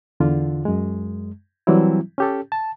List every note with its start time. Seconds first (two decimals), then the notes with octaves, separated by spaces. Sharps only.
0.20 E2 D3 F4
0.65 F#2 G#3
1.67 E3 F#3 G3 C4 E4
2.18 C#4 G4 A4
2.52 A5